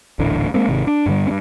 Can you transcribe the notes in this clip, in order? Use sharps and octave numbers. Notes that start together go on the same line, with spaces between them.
D#1 A1 A2 D3
G#3 A#3 C4
G#1 C3 D#3
D4
G2 D3 G3
G2 C#4